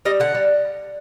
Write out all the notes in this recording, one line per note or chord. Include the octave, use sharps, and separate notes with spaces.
G3 D#5
D3 F#5
G3